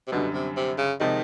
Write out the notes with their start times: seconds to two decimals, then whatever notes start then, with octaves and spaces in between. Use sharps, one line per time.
0.07 C3
0.12 F#2 B2 D3 G3
0.34 C3
0.56 C3
0.78 C#3
1.00 C3 D#3 F3 G#3